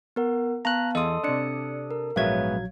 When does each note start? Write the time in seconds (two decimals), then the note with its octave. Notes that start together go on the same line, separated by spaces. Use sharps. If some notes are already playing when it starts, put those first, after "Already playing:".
0.16 B3 A#4 F#5
0.65 B3 F5 A5 A#5 F#6
0.95 E2 A4 D#5 C6 D#6
1.24 C3 D4 D5 C#7
1.91 A#4
2.16 A#1 G#2 F#3 B3 C#5 E5 F5 G#6